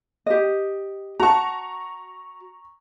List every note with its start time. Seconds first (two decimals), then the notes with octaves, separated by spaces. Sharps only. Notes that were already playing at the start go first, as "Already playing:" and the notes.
0.26 G4 D#5
1.20 F#4 F#5 A5 A#5 C#6